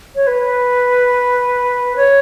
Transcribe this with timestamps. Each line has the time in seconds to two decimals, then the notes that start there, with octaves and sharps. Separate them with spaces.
0.16 C#5
0.27 B4
1.96 C#5